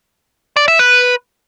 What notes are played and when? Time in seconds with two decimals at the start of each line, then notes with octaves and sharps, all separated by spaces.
0.57 D5
0.68 E5
0.79 B4